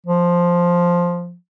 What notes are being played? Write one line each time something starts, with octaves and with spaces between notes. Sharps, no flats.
F3